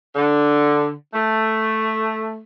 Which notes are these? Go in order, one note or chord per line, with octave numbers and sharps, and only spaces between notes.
D3
A3